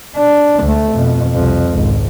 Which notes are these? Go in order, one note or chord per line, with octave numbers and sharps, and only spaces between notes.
D4
D2 A3
F2 B2
C2 F2
G#1 C#2